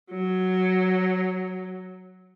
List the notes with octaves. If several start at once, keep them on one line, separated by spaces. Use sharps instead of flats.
F#3